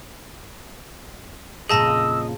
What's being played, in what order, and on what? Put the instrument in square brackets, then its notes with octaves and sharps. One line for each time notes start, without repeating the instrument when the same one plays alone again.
[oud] F2 A#2 C#3 [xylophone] G#4 A5 A#6 [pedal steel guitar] D#5 [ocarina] E6